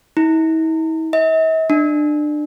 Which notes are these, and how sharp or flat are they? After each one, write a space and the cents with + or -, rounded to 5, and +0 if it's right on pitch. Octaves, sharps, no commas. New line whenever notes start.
E4 -45
E5 -45
D4 +30